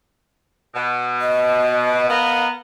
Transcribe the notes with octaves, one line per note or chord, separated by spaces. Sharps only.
B2
D#5
B3 A#4 D#5 F5